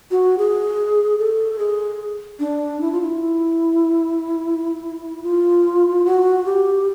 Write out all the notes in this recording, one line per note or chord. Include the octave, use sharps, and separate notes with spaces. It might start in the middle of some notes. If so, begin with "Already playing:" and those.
F#4
G#4
A4
G#4
D4
E4
F4
E4
F4
F#4
G4